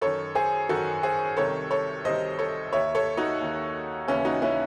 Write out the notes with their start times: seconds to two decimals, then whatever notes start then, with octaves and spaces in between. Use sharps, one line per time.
0.01 F#2 D#3 A4 C#5
0.35 G#4 C5
0.69 F#2 D#3 F#4 A4
1.03 G#4 C5
1.37 C2 C3 D#3 A4 C#5
1.71 A4 C#5
2.05 C2 C3 D#3 C5 D#5
2.38 A4 C#5
2.73 D#2 D#3 C#5 E5
2.95 A4 C#5
3.17 D#4 F#4
3.40 D#2 D#3
4.08 D#2 C#3 E3 C#4 E4
4.25 D#4 F#4
4.42 C#4 E4